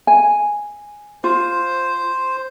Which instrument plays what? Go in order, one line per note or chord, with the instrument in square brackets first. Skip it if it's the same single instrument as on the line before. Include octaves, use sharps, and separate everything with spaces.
[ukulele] G#5
[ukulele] F4 [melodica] C5